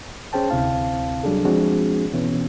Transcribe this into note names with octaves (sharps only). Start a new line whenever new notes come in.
C#4 G#4 C5 G5 A5
D2 C3 C4 E4 F5 A5
F#3 G3 D4 G#4 A4
F3 G#3 C4 D4 F#4 G#4
B2 E3 B3 C#4